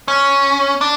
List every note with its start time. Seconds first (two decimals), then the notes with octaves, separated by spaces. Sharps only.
0.08 C#4
0.81 D4